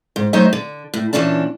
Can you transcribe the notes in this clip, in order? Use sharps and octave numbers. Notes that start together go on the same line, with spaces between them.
G#2
F#3 A3 D#4 C5 D#5 E5
D3
A2
A#2 E3 C#4 D4 A5